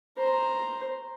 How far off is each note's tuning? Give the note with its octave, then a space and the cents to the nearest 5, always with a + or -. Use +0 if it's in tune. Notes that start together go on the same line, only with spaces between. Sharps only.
C5 +0 A#5 +0